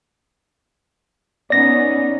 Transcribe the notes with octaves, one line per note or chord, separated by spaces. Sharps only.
B3 C#4 D#4 D5 A#6